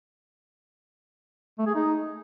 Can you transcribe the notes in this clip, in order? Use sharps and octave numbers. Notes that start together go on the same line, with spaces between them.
A3
G#4
D#4